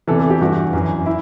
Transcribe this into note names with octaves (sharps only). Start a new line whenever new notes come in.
E2 C3 E3 A4
A4
G4
G2 E3 F#4
F#2 E3
E4